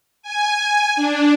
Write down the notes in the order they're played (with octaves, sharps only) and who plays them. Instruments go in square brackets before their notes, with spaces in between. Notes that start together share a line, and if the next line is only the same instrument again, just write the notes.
[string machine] G#5
D4